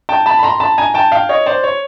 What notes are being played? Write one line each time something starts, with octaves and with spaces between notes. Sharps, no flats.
G5 A5
A5 B5
B5
A#5 C6
A5 B5
G#5 A#5
G5 A5
F5 G5
C#5 D#5
C5 D5
C#5